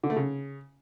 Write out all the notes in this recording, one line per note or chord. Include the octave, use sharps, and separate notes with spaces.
D3
A3
C#3